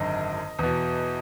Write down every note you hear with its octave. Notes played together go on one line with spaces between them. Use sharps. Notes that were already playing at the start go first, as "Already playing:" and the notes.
Already playing: G#1 F#2 D3 D#5
E2 B2